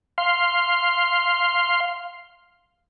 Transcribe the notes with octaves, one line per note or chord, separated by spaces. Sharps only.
F5 C6